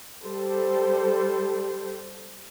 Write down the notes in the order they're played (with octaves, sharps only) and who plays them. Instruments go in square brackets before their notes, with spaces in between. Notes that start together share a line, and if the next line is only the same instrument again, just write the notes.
[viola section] G3 G4 A4 C5